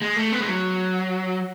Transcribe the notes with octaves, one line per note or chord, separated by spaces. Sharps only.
G#3
A3
B3
G#3
F#3